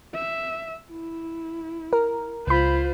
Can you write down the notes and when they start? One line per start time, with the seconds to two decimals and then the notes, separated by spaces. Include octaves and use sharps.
0.14 E5
0.91 E4
1.93 A#4
2.47 C#2 F4 C5 B5